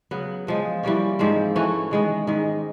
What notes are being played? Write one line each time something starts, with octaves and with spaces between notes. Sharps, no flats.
C#3 F#3 B3
C#3 F3 G#3
E3 G3 A#3 C#4
G#2 F3 G#3 C4
E3 A3 C#4 F#4
D#3 G#3 B3
G#2 D#3 G#3